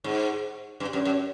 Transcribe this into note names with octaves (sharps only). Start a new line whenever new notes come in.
G#2
G2
F#2
F#2